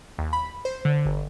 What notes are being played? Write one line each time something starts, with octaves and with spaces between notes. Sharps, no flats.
D#2
B5
C5
D3
G1